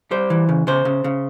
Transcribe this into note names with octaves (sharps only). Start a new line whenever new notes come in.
G3 C5
E3
C#3
C#3 C5
C#3
C#3